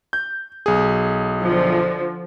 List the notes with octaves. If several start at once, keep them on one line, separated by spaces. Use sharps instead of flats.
G6
B1 G#4
D3 F3